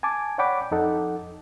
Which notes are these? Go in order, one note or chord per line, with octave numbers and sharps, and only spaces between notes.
G#5 A5 D6
C#5 D5 F#5 G5 B5 D6
F2 D#4 A4 F#5